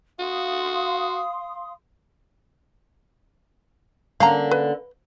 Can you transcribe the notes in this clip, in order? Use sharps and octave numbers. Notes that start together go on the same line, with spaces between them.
F#4 F5 C6 D#6
D3 A#3 C#4 F5 A#5
B4